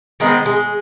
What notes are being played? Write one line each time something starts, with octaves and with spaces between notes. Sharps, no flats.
D#3 G#3 B3 C4
G#3